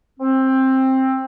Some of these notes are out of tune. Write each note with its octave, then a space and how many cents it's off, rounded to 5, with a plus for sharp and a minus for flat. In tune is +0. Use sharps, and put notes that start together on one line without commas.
C4 +15